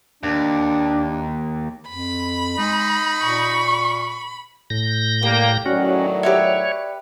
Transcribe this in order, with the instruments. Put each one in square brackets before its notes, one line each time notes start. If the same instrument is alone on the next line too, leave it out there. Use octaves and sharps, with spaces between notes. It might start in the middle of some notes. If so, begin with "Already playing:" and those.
[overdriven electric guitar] D#2 [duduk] D4
[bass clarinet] F2 [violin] B5
[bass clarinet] G#3 [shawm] D#4
[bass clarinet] A#2 [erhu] C#6
[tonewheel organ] A2 G6 A#6
[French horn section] G3 A#3 [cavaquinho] G4
[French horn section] A2 D#3 F#3 [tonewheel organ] C#4 F#4 [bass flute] D5
[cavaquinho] G4 B4 E5 [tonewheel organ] C#5